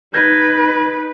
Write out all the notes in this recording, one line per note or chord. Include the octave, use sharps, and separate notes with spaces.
D#4 B4 G6 G#6 A#6